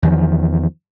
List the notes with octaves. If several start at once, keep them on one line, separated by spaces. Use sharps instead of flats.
E2 D#3 F3